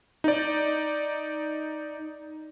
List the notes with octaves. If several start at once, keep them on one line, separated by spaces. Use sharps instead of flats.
D#4 D5